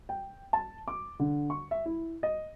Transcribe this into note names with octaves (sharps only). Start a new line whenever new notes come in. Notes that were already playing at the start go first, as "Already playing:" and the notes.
G5
A5
D6
D3
C#6
E5
E4
D#5